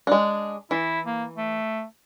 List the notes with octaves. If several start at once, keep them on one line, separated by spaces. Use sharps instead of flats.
G#3 D4
E3 E4
A#3
A3